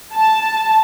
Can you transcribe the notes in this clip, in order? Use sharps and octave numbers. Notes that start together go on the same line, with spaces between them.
A5